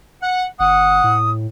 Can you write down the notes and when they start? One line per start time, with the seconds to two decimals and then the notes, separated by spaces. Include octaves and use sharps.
0.22 F#5
0.60 G1 F#5 D#6
1.04 A2